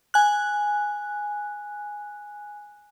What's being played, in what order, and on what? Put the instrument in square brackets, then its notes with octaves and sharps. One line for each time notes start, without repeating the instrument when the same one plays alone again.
[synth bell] G#5 F#6